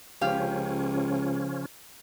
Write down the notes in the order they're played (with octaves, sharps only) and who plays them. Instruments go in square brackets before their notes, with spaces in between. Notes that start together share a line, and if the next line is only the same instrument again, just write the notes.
[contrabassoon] C#2 [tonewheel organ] C#3 F3 C#4 [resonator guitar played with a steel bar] G4 F5